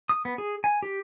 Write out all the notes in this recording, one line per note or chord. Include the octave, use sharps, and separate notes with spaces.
D#6
B3
G#4
G#5
G4